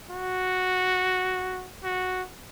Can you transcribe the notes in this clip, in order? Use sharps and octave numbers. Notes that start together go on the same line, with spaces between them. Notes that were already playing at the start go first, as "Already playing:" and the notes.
F#4
F#4